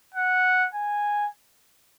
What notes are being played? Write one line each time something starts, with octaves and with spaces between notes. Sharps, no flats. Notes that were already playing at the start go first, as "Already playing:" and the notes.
F#5
G#5